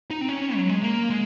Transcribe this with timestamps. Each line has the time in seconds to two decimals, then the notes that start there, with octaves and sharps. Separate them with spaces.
0.11 D#4
0.21 C4
0.29 C#4
0.56 F#3
0.69 G#3
0.82 A#3
1.10 G#3